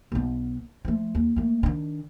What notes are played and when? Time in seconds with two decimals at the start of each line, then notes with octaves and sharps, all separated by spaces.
0.12 B1 B3
0.85 F3 A3
1.15 D#2
1.36 A3 A#3
1.63 D#3 D4